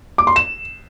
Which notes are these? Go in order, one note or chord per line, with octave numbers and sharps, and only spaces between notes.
D6
C6
E7